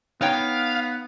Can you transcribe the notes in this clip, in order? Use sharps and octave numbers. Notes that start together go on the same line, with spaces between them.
B3 D#4 C#5 F5 G5